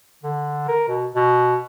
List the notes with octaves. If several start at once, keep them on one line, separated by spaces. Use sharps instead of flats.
D3
A#4
B2
B2